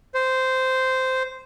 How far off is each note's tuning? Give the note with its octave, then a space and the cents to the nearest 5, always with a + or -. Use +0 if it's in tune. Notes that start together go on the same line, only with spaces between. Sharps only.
C5 -10